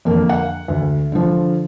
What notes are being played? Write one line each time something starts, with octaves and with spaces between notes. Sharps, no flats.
F2 D3 A#3
F#5
D2
D3 F3